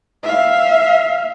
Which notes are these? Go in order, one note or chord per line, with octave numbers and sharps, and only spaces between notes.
E5 F5